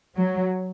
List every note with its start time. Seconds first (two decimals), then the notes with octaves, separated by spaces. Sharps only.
0.17 F#3